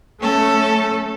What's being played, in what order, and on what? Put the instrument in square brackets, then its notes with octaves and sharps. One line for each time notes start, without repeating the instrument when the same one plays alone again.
[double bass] A3 [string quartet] C#4 A4